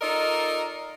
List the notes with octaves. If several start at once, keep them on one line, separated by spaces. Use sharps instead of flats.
D#4 F4 A4 A#4 D5 D#5